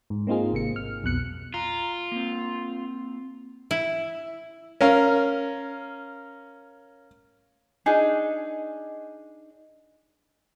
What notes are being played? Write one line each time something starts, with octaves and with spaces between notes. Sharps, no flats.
G#2
A#3 C4 D#4 F4 G#4
G#1 C3 A#3 C#7
F6
B1 F2 B2 F#6 C#7
F4 A#5
A#3 C4
E4
C#4 A#4 F5
D4 D#4 G#4